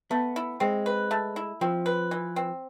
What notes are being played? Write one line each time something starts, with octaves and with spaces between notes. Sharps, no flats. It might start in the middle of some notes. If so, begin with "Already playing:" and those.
A3 B3
E4
G#3 C4
B4
A3
E4
F3 C4
B4
E3
C4